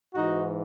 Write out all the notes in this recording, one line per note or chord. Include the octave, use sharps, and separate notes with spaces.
G#2 E3 D#4 F#4